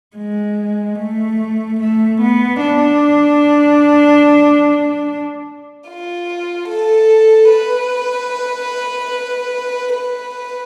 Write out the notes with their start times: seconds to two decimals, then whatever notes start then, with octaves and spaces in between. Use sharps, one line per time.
0.16 G#3
0.98 A3
1.79 A3
2.20 B3
2.60 D4
5.88 F4
6.68 A4
7.50 B4
9.95 B4